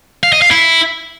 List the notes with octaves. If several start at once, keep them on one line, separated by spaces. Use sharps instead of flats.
F5
D#5
F5
E4